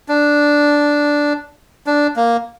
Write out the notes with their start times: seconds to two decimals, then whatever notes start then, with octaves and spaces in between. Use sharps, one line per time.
0.08 D4
1.87 D4
2.16 A#3